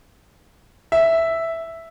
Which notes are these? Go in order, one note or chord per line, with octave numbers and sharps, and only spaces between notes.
E5